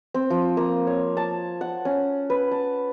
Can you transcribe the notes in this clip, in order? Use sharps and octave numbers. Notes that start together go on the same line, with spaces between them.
C4
F3
A#3
C#5
A5
F#5
C#4
B4
A5